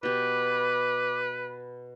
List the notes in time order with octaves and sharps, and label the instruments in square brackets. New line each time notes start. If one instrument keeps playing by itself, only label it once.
[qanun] B2 G4 [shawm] B4 [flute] D6